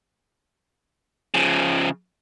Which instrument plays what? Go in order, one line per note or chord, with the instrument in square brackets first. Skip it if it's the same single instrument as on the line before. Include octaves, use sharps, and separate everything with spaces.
[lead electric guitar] C#3 F3